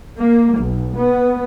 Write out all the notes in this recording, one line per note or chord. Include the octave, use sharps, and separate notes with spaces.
A#3
B1
B3